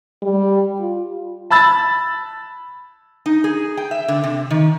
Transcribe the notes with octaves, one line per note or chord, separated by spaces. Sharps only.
G3
F4
A5 B5 E6 A6
D#4
G#4
G5
E5
D3
C3
D#3